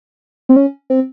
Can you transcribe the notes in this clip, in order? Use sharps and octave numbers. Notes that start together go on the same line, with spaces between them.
C4
C#4
C4